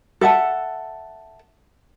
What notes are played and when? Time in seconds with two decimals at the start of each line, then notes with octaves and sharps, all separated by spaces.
0.21 A4 E5 F#5 A5